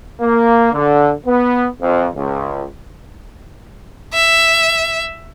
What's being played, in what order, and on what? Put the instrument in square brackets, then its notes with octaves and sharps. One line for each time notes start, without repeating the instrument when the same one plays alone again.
[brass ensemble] A#3
D3
B3
F2
C#2
[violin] E5